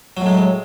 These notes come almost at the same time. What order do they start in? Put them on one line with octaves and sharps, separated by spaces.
F#3 A2 G#3